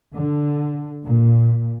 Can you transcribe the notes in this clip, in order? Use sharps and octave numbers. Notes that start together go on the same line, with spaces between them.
D3
A#2